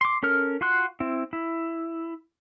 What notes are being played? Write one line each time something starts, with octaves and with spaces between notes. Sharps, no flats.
C6 D6
C#4 A4 A#4 F6
F4 F#4 C6 F#6
C4 E4
E4